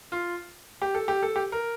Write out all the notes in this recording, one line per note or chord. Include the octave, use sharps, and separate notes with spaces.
F4
G4
A4
G4
A4
G4
A#4